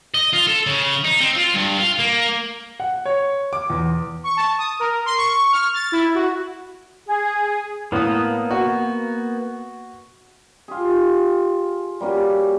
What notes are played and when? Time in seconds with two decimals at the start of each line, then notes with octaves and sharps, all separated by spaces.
0.14 D#5
0.33 F4
0.47 A4
0.67 C#3
1.04 D#4
1.20 C4
1.36 F4
1.54 G2
1.78 F4
1.99 A#3
2.80 F#5
3.06 C#5
3.53 D6
3.70 E2
4.24 C#6
4.37 A5
4.58 D#6
4.80 A#4
5.06 C6
5.17 C#6
5.52 F6
5.74 A6
5.92 E4
6.15 F#4
7.07 G#4
7.92 A2 A#3 B3 D#6
8.51 F#4
10.68 F4 G4 G#4
12.01 G3 A#3 C#4 F#4